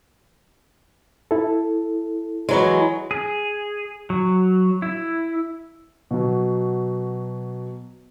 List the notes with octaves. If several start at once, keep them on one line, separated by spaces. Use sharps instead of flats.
E4 A4
E3 F#3 G#3
G#4
F#3
E4
B2 F#3